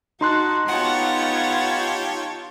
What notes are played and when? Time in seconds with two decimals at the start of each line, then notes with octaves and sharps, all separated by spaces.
0.21 D#4 F#4 A5 C6 F#6
0.68 B3 F4 G4 C#5 F#5 A5